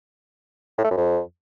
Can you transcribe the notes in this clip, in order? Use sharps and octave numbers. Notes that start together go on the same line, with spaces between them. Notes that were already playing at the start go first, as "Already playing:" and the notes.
A2
A3
F#2
F2